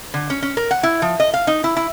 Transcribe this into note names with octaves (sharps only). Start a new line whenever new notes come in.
D3
C#4
C#4
A#4
F#5
E4
F3
D#5
F5
D#4
E4
E4